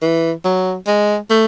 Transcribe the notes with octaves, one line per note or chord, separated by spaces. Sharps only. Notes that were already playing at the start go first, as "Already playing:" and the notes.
E3
F#3
G#3
A3